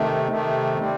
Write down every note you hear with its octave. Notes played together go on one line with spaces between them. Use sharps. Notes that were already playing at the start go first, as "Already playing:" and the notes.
Already playing: C3 D#3 A3
C3 D#3 A3
C3 G3 C4